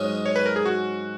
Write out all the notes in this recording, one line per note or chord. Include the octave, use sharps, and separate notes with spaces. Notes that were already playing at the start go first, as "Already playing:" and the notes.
Already playing: G#2 F#3 C#4 D#5
C#5
B4
A#4
G#4
F#4